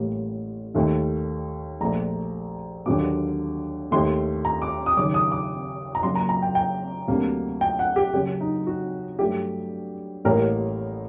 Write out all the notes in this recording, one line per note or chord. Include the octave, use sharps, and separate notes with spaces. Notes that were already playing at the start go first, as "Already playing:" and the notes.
Already playing: A1 A2 G3 A#3
D#2 D#3 A3
A#1 A#2 A3 A#5
D#2 D3 F#3 A#3 D6
D#2 D#3 A3 C6
A#5
D6
D#6
F#1 F#2 D#3 D6
D#6
D6
A#5
F#1 F#2 F#3 A#3 C6
A#5
A#5
G5
G5
D2 C3 F#3 A#3
G5
F#5
G4
F#1 F#2 F#3 G4
D#4
F#4
G2 F#3 A3 G4
A1 A2 G3 A#3 A#4